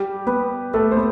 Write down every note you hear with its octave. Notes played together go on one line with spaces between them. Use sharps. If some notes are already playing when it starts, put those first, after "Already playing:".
Already playing: G3 G4
B3 B4
A3 A4
C5
B3